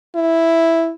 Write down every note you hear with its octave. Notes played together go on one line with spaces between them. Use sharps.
E4